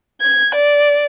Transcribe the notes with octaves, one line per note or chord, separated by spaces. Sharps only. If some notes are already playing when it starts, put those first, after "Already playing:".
G#6
D5